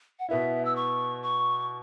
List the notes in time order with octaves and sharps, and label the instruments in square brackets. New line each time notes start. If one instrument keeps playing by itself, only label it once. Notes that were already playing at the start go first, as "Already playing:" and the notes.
[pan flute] F#5
[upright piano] B2 B3 E4 [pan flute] E5
[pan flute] E6
C#6
C#6